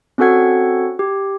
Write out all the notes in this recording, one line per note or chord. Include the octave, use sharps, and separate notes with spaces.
C4 C#4 F#4 A4 F#5 G#6
G4